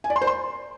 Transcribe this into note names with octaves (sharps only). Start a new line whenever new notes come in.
G#5
D5
C6
C5
C6